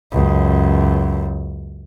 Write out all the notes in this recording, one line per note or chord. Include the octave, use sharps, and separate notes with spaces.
C#2 F#2